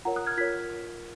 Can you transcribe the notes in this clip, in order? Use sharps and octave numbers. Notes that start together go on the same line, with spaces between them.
F4 A#4 C#5 F#5 A#5
D#6 F#6
F6 G#6
F4 A#4 C#5 G#6 B6